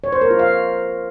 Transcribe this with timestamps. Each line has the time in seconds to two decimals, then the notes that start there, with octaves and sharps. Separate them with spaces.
0.04 C#5
0.13 C5
0.21 A#4
0.30 F4
0.39 F5